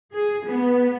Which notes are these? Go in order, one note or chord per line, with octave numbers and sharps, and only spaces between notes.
G#4
B3